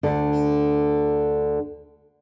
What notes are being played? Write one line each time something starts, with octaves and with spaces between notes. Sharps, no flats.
D2 D3